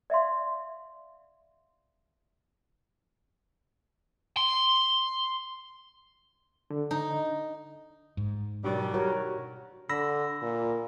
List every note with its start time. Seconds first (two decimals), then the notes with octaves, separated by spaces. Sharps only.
0.10 D5 E5 F5 C6
4.37 C6
6.70 D3
6.91 D#4
8.17 G#2
8.64 B2 D#3 F#3 G3 D4 D#4
8.94 F#4 G4 A#4 C#5
9.89 D3 B5 E6 A#6
10.42 A#2